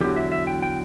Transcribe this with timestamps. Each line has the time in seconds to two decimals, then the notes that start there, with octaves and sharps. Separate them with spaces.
0.01 E2 D3 F#3 G4
0.16 E5
0.32 E5
0.47 G5
0.62 G5